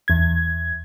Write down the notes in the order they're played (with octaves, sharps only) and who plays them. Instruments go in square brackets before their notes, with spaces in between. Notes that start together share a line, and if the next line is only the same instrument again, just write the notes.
[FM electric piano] E2 G#6